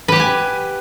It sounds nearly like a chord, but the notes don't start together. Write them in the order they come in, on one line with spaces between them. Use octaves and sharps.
B4 G4 F#5 G#5